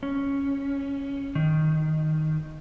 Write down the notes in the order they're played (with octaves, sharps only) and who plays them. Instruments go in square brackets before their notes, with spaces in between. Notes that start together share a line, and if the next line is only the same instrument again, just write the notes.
[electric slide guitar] C#4
D#3